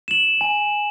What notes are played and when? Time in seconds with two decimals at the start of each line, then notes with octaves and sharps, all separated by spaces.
0.08 E7 F#7
0.41 G#5